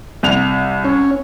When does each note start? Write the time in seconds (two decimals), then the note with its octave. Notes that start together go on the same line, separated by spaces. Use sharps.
0.23 C2 F7
0.85 C#4